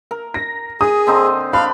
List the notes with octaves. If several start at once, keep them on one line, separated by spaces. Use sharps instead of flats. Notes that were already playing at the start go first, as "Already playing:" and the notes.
A#4
A#6
G#4 D#6
D3 C4 D#4
D4 F5 B5